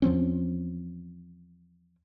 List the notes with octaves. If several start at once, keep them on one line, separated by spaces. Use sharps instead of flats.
E2 F3 C4 C#4